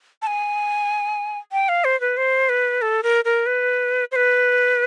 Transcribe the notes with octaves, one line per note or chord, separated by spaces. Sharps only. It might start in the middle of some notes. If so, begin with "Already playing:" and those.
A5
G#5
G5
F5
C5
B4
C5
B4
A4
A#4
A#4
B4
C5
B4